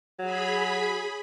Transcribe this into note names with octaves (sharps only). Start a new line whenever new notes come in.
F#3 G#4 B5